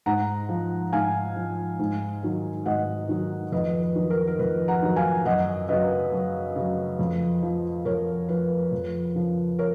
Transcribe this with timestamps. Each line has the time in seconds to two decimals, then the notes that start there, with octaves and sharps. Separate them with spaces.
0.06 G#2 F#5 A#5
0.49 F3
0.93 G#2 F5 G#5
1.36 F3
1.79 G#2
2.23 D#3 F#3
2.66 G#2 D#5 F#5
3.09 D#3 F#3
3.52 F2 B4 D#5
3.82 B4
3.96 D#3 F#3
4.10 A#4
4.27 A#4
4.39 F2 B4
4.68 F#5 A#5
4.82 D#3 F#3
4.96 F5 G#5
5.25 F#2 D#5 F#5
5.69 C#3 F#3 B4 D#5
6.12 F#2
6.55 C#3 F#3
6.99 F2
7.42 F3
7.85 F2 A#4 C#5
8.29 F3 B4
8.72 F2
9.15 C#3 F3
9.59 A#4 C#5